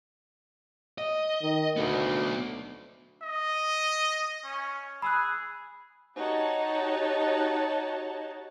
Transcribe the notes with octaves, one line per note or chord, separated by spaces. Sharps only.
D#5
D#3
D2 B3 D#4
D#5
C#4
G#4 B5 E6 F#6
D#4 F#4 G4 C#5 A5